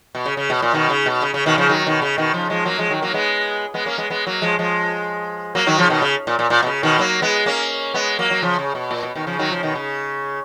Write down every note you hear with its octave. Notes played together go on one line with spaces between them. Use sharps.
B2
C#3
C#3
B2
A#2
B2 D#3
C#3
B2
C#3
C#3
B2 D#3
C#3 F3
D#3 F#3
B2 D#3
C#3
B2 D#3
C#3 F3
F3 G#3
F#3 A#3
F3 G#3
D#3 F#3
F#3 A#3
G#3 B3
G#3 B3
A#3 C#4
G#3 B3
G#3 B3
F#3 A#3
F3 G#3
F3 G#3
F#3 A#3
D#3 F#3
C#3 F3
B2 D#3
C#3
A#2
A#2
A#2
B2
C#3
B2 D#3
F#3 A#3
G#3 B3
A#3 C#4
G#3 B3
F#3 A#3
F#3
C#3 F3
C#3
B2
A#2
B2
B2 D#3
C#3 F3
D#3 F#3
C#3 F3
B2 D#3
C#3